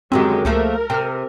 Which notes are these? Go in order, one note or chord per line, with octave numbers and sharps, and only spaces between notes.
F#2 D3 D#3 F#3 G#3 C4 G4
C#2 F3 A3 A#3 A#4
C3 G5 F6